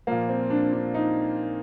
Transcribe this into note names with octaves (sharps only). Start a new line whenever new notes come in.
A#2 F3 A#3
C4
D4
D4
D#4